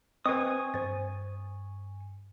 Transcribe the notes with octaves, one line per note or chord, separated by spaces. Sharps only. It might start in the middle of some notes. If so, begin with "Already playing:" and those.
C4 B4 D#5 G#5 C#6 D#6
G2 C5 A6